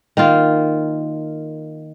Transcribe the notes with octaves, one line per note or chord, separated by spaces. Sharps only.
D#3 A#3 F4